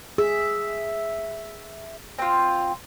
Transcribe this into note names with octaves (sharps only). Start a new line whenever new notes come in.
G#4 E5
C4 F4